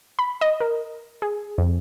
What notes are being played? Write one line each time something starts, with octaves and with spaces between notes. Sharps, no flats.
B5
D#5
A#4
G#4
F2